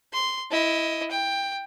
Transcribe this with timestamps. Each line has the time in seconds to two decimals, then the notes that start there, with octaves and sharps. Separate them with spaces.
0.13 C6
0.51 E4 D#5
1.11 G5